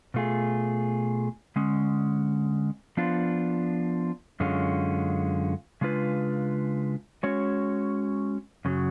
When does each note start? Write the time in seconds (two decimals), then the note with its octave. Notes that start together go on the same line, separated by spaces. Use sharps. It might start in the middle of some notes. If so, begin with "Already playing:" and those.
0.14 B2 A3 F4 G#4
1.56 D3 G#3 C#4
2.97 F3 B3 D4 F4
4.40 F#2 D3 G#3 C#4 F4
5.81 C#3 G#3 D4 F4 B4
7.23 G#3 C#4 F#4 C#5
8.65 F#2 C#3 F#3